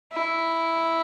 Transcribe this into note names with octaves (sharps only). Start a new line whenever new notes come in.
E4